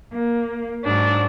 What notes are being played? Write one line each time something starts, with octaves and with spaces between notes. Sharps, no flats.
A#3
G#2 F#3 D4